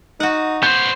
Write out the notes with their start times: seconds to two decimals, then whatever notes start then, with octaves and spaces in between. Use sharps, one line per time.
0.20 D#4 F#4 F#5
0.63 B3 C5 G6